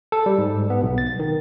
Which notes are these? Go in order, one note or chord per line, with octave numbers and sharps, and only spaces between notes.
A4
G3
G#2
B3
B1
A6
D#3